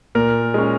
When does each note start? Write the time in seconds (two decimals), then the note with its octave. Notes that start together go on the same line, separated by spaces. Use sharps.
0.15 A#2 A#4
0.54 G#3 C#4